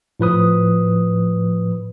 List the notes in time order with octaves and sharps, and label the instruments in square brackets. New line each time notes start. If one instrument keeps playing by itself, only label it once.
[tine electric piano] A2 F3 B4 D#6